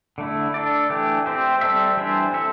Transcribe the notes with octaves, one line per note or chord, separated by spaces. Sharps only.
D3 A3 E4
D4 A4 D5
E3 A3 D4 G4
C4 G4 C5 E5
G3 C4 A4 E5
E3 G3 D4 C5 E5
C4 A4 E5